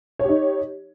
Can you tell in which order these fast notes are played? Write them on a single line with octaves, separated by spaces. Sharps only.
C#5 G4 D#4